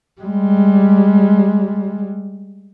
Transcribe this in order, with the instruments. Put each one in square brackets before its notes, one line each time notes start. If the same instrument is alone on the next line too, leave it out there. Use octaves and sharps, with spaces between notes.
[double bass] G3 G#3